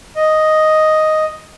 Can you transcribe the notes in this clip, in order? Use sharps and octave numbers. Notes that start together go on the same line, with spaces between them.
D#5